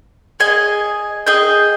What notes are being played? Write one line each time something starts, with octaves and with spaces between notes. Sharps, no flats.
G#4 D#5 G#5
G#4 D#5 G5